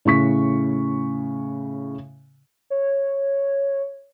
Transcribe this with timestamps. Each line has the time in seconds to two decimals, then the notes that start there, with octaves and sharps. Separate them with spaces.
0.05 A2 C#3 C#6 B6
2.70 C#5